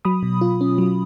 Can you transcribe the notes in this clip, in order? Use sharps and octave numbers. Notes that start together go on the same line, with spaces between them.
F#3 B5 D#6
B2
F4
C#4
F#3